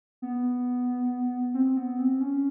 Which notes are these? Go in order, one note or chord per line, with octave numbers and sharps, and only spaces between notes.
B3
C4
B3
C4
C#4